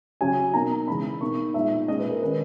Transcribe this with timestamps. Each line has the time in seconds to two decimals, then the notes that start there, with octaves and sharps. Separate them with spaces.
0.21 C#3 F#3 C#4 G#5
0.53 B2 A#3 D#4 A#5
0.88 C#3 E3 G#3 C#4 B5
1.21 B2 A#3 D#4 C#6
1.54 A#2 G#3 B3 D#4 E5
1.88 A#2 G#3 C#4 D#5
1.99 B4
2.10 A#4
2.22 D#3 G#3 C#4 B4